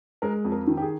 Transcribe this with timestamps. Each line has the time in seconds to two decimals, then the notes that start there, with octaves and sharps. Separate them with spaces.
0.22 G#3 A#4
0.45 F2
0.52 A#4
0.67 D#3
0.77 G4
0.81 G#4